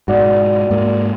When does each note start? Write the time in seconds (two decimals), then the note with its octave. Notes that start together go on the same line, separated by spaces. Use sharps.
0.08 G#2 B2 F#4 D5
0.71 G#2 A#3